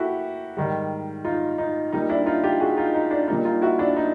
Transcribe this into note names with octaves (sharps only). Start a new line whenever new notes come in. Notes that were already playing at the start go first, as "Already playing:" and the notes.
Already playing: A#3 E4 F#4 G4 A4
G#2 D#3 G3
D#4 F4
D#4
A#2 G3 A#3 D#4
D4 E4
D#4 F4
F4 G4
F#4 G#4
D#4 F4
D#4
D4
A#2 G3 A#3 D#4
D#4 F4
E4 F#4
D4 E4
D#4